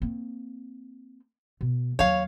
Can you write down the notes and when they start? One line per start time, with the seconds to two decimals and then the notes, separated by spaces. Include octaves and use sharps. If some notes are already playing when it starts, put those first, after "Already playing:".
0.02 A#3 C4
1.61 B2
1.99 D#2 F#3 C#5 F5